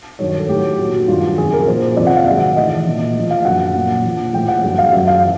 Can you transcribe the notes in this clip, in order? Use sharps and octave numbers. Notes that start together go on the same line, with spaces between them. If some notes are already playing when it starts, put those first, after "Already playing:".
G2 D#3 F#3 C#5
C#5
A4
A2 F#3 G4
A#2 F#3 F#4
F#4
G2 D#3 F#3 F4
F#4
F2 C#3 F#3 G#4
A#4
A#2 F3 C5
F2 C3 F3 D5
F#5
F5
G#2 D#3 F#3 E5
A2 E3 D#5
A#2 F3
A2 F3
F5
F#2 D3 F#3 F#5
A#2 F#3
A#2 F3
A2 F3 G5
F#5
G2 D3 F#3
F5
F#2 D3 F#3 E5
F5
E3